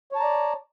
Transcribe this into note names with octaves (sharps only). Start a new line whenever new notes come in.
C#5 D5 A5 A#5